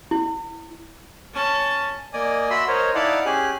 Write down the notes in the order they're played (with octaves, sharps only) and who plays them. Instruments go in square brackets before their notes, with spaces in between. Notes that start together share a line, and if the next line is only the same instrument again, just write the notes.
[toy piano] E4
[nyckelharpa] C#4 A5
[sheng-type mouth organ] A#3 D5 D#5 G#5 D#6
F#4 E5 B5 C6 E6
A#4 C5 C#5 D#5
D#4 E4 D5 F5 F#5 A5
C#4 G4 G#4 G#5 F#6